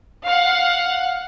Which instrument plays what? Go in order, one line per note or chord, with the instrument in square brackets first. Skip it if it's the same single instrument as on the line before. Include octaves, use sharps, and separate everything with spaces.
[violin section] F5 F#5